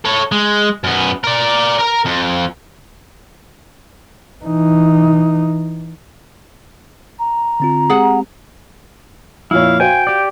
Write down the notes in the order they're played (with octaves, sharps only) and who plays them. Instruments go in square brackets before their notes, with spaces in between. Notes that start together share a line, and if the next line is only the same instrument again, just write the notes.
[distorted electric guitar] A4 C#5
G#3
F#2 B3
A#4 D5
A#4 A#5
F2
[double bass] E3 D#4
[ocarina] A#5
[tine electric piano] D3 C4 F4
[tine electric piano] G#3 C4 G4 [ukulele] G#4 F#5
[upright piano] F2 A#2 C#5 [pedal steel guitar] E4 [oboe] F5
[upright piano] F#4 C5 F5 [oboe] G5 [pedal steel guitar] G#5
[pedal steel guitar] G4 D5